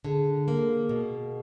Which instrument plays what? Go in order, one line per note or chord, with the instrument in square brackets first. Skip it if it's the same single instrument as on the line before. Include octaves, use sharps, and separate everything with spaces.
[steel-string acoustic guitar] D3 [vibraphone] G#4
[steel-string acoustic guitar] A#3
B2